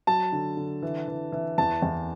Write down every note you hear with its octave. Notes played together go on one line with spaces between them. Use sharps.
F#3 A5
D3
D3
E3
E3
E3
E2 A5
E2